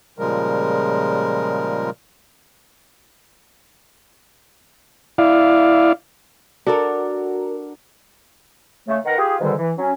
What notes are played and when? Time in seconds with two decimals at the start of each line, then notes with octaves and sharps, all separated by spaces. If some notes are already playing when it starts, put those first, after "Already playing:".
0.19 A#2 C#3 F3 G3 G#3 A#4
5.18 E4 D5 F5
6.67 D4 F#4 A4 A#4
8.88 C#3 A3
9.05 D#3 D#4 A#4 B4 F#5
9.18 F4 G4 G#4
9.40 G#2 B2 D3 D#3 G3
9.59 E3
9.78 F#3 C#4